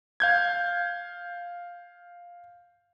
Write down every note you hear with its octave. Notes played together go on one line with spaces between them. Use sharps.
F5 G6 G#6